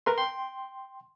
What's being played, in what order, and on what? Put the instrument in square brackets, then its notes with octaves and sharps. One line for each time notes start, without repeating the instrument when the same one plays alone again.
[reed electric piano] A#4 B4 C6
G5 C6